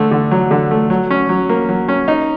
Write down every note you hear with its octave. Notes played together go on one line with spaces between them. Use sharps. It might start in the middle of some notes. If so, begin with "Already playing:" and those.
Already playing: D3 A3
D3
F#3
D3
A3
F#3
C#4
F#3
A#3
F#3
C#4
D#4